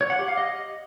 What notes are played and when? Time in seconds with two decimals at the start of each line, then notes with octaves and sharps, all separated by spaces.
0.01 C#5
0.10 F#5
0.19 G4
0.28 F5
0.37 D#5